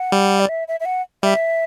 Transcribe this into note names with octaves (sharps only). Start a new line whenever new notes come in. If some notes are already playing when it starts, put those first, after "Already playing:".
Already playing: F#5
G3
D5
E5
E5
E5
F#5
G3 E5